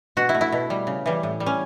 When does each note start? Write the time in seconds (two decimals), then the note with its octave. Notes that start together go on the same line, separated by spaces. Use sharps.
0.17 B2 F#4
0.29 E4
0.35 A3
0.41 E4
0.52 B2
0.70 G3
0.87 C#3
1.06 E3 G3
1.23 A2
1.40 G3
1.46 C#4